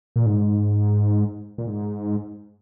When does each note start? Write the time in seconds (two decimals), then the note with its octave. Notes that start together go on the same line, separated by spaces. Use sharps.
0.16 A#2
0.26 G#2
1.58 A#2
1.67 G#2